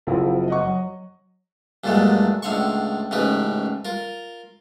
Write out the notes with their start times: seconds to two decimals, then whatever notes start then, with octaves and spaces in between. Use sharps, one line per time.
0.07 F#1 F3 C4 E4
0.48 D#5 F#5 C#6
0.61 F#3
1.84 G2 A#2 D3 F#3 G#3 A3
2.42 C#2 A2 D3 F5 C6 C#6
3.11 A1 G#2 C#3 A#4 B4
3.85 F4 A#4